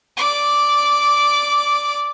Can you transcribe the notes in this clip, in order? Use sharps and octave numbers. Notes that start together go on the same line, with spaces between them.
D5 D6